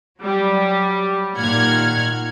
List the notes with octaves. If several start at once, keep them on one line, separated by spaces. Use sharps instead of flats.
F#3 G3
A#2 D#3 F#5 F6 G#6